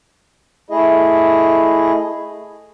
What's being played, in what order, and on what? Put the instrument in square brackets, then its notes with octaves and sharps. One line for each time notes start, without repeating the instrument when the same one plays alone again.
[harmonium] A3 E4 G#4 D#5